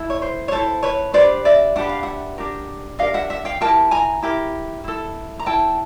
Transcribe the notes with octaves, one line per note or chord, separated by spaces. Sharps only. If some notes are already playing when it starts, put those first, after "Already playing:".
Already playing: E4 A4
C#5
C5
C#5
E4 A4 C5
B4 C#5
D4 G4 B4 C5 D5
D5 E5
D4 G4 B4 F#5
F5
E5 F#5
D4 G4 A#4
D4 G4 A#4 D#5 F5
E5 F#5
E5 F#5
F5 G5
E4 G4 A#4 G5 A5
G#5 A#5
E4 G4 A#4
E4 A4
A#5
E4 A4 G5 A5